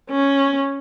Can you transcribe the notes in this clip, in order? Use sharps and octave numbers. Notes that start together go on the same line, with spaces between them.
C#4